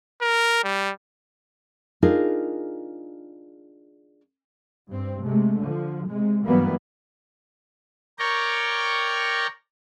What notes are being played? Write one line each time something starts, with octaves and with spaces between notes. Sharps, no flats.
A#4
G3
D4 D#4 F4 G#4 A#4
G2 C4
C3 G#3 A3
D3 F3
C3 G#3
G2 E3 F#3 G3 A#3 B3
A#4 C#5 D5 G5 A#5 C#6